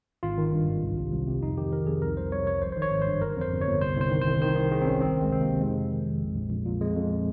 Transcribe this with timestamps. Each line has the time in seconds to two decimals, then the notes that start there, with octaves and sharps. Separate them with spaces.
0.23 G#1 F4
0.38 D#3
0.52 G2
0.68 G#1
0.82 C2
0.97 C3
1.12 C2
1.27 C3
1.42 F2 D#4
1.57 D#3 G4
1.72 D#3 A#4
1.86 F2 G#4
2.02 C2 A#4
2.17 C2 C5
2.32 C2 C#5
2.47 F3 C#5
2.62 G#1 C5
2.72 D#3 C5
2.82 C#5
2.92 G#1
3.02 G2 C5
3.22 G1 A#4
3.36 F2 C5
3.51 G1
3.61 C#5
3.67 G1
3.81 C2 C5
3.96 C2 C5
4.11 D#3
4.22 C5
4.27 C2
4.42 D#3 C5
4.56 D#3
4.71 D#3 G#4
4.81 C4
4.86 G#1 C#4
5.01 D#3 C4
5.16 C#2
5.21 G#3
5.31 C3 C4
5.41 A#3
5.46 C3
5.61 F2 G#3
5.76 C3
5.91 D#3
6.06 F2
6.21 A#1
6.36 A#1
6.50 A#1
6.65 A#2
6.81 F2 G#3
6.95 F2